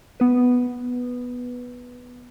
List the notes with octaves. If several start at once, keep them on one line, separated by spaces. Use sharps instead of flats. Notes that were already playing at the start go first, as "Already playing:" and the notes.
B3 B4